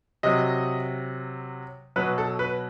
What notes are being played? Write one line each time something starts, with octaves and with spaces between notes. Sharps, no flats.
C3 F#3 D#5
B2 F#3 B4
A4
B4